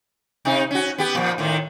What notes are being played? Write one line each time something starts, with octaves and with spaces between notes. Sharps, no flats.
C3 D#4
C#4 F#4
B3 G4
A#2 F3
A2 D#3